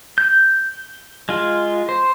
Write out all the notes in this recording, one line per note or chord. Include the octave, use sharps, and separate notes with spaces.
G6
G#3 F4
C5